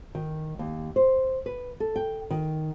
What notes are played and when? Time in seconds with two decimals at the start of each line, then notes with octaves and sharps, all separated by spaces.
0.15 D#3
0.59 D#2
0.96 C5
1.46 B4
1.80 A4
1.96 G5
2.31 D#3